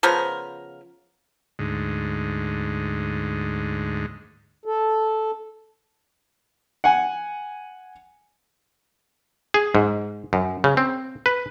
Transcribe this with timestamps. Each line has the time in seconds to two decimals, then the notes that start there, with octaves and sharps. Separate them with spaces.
0.03 C#3 F3 B3 A#4
1.59 D2 G#2
4.66 A4
6.84 F#5 G#5
9.54 G#4
9.75 G#2
10.33 F#2
10.64 C#3
10.77 C4
11.26 B4